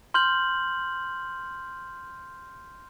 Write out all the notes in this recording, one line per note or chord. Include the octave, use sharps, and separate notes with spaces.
C6 F6 G6 F#7